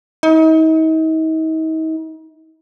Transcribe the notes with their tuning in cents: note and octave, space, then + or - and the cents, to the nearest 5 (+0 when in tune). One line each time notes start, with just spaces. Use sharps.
D#4 +40